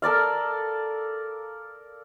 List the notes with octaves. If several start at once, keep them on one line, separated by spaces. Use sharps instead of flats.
A4 A#4 D5 F5